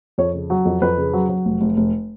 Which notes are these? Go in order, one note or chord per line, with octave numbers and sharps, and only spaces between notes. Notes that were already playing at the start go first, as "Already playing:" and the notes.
F2 C#5
C#3
F#3
F2
F2 B4
C#3
F#3
F#3
F1
F1
F1